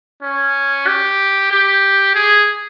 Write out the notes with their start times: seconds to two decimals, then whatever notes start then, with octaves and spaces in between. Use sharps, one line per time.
0.22 C#4
0.87 G4
1.51 G4
2.15 G#4